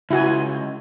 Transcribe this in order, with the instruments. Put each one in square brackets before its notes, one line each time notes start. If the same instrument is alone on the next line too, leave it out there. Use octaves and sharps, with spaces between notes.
[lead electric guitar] C#2 [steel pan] E4 F#4 G#5